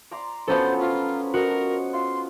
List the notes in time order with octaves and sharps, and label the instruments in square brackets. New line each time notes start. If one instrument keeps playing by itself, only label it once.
[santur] D5 A#5 C6
[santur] F3 F#3 D5 [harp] B3 C#4 A4 [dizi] C5
[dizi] F4 [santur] B4 C#5 A#5
[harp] F#4 [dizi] A#4 [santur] D#5
[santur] F4 [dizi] C6